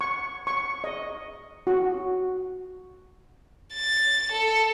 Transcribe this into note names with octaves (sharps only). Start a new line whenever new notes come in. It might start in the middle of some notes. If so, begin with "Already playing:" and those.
C#6
C#6
D#5
F#4
A6
A4